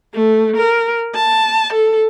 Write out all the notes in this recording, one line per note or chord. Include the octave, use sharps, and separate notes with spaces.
A3
A#4
A5
A4